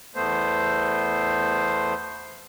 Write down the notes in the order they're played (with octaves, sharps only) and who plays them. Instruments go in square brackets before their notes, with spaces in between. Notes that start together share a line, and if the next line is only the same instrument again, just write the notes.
[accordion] E2 A3 B3 C5